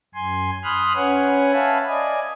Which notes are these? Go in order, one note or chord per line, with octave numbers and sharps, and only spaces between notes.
F#2 G#5 C6
B5 C6 D#6 F6 F#6
C#4 B4 C#5 F#5 G#5
E5 F5 G#5 A5 B5
D5 D#5 G#5